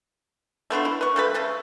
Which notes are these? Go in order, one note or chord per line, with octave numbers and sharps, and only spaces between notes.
A3 B3 D4 F4
E4
B4 C#6
F3 A3 B4
C#3 A3 A4